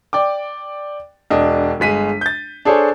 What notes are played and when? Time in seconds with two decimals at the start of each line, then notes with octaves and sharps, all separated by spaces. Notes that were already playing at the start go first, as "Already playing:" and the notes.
0.13 D5 G5 D6
1.30 E1 D4 D#5
1.80 G1 G#3 B6 D#7
2.21 G6 A6
2.65 D4 G#4 A4 C5 C#5